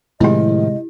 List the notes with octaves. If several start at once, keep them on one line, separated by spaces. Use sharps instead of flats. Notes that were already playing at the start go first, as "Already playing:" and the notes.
A2 C3 D#3 F3 G#3 E4 G4 D#5